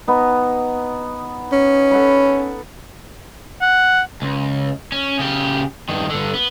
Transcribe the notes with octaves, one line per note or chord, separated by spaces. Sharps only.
B3 D#4
C#4
A4 F#5 B5
F#5
C#2
C#4
C#3 G4
G2 D#3
G2 D3
B3